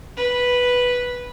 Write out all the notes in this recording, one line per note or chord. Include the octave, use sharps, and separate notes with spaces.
B4